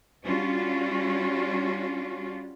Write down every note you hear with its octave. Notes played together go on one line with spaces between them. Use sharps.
G3 C#4 D4 F4 F#4